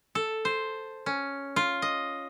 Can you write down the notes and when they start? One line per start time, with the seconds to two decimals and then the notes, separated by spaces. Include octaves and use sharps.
0.15 A4
0.45 C5
1.06 C#4
1.56 F4
1.82 D#5